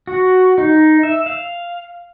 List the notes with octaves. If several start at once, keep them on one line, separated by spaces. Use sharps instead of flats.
F#4
D#4
E5
F5